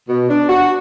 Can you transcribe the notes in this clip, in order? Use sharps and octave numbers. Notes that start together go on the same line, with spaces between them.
B2
D4
F#4